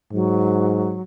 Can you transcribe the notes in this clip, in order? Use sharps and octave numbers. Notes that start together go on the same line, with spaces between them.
G#2 F#3